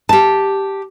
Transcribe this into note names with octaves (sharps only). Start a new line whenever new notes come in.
G4 A5